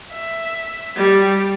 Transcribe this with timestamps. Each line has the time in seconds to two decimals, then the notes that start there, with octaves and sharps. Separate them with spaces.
0.12 E5
0.96 G3